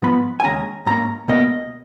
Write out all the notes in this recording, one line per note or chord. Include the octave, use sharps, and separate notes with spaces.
G#2 F3 B3 B5
G#5
D#2 C#3 G#3 C#4 A#5
G#2 F3 A#3 C#4 A#5
C#2 B2 A#3 D#5